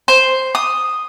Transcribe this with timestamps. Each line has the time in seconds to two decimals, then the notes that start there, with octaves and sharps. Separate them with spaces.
0.08 C5
0.55 D#6